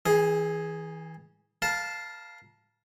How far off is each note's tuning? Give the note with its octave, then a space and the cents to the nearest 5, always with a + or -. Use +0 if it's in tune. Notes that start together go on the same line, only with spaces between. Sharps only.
E3 -35 G#4 +0
A#4 +30 F5 +0 A5 -5